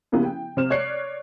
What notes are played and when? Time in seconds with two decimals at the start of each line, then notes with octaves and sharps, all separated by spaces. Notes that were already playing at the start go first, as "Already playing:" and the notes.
0.12 C#3 A#3 B3 E4 G4
0.25 G5
0.57 C3 C5 F6 E7
0.70 C#5 D5 F#6 C7 C#7